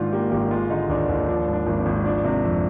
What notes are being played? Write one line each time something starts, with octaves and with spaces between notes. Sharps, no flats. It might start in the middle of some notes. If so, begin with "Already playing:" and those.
Already playing: G#2 D#3 D4 F4
A#3 G4
G#1 G4
G#3 F4
D3 D#4
D#2 D4
D#2
F3 D4
G#2
D4
G#1
C4
G#1
F3 D4
C3
F2